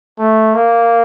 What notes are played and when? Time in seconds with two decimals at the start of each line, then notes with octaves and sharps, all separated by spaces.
0.19 A3
0.54 A#3